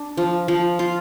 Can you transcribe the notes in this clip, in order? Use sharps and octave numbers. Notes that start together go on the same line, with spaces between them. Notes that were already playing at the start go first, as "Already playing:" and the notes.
Already playing: D4
F3
F3
F4